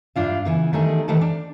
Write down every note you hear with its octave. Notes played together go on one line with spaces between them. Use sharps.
G2 D4 F4 E5
C#3 E3 B3
D#3 G3 A3 D4 G#4
D#3 E3 A3 G4 C5 A5
D4